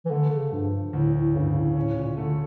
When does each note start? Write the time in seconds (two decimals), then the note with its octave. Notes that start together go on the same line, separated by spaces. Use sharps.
0.05 E3
0.11 D3 A3
0.32 C#3
0.52 G2 F3
0.93 D2 A2
1.14 A2
1.35 G2 C#3
1.56 A2
1.76 A2 C#4
1.97 A#2
2.17 D3 A3